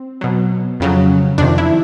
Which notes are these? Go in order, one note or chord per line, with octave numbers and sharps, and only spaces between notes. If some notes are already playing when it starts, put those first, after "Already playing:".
Already playing: C4
B2 F#3
F2 C#3 F#3
F2 C3 D#3 D4
E4